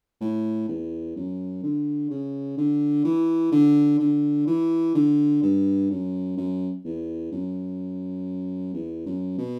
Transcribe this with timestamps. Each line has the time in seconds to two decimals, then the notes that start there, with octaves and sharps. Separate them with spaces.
0.21 A2
0.68 E2
1.16 F#2
1.63 D3
2.10 C#3
2.57 D3
3.05 E3
3.52 D3
3.99 D3
4.47 E3
4.95 D3
5.42 G2
5.90 F#2
6.37 F#2
6.85 E2
7.31 F#2
8.74 E2
9.06 F#2
9.38 B2